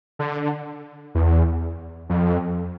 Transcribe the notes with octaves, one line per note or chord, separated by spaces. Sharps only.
D3
E2
F2